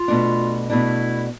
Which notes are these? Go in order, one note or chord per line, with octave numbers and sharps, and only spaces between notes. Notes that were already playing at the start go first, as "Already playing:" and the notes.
Already playing: F4
B2 A3 D4
B2 A3 D4 E4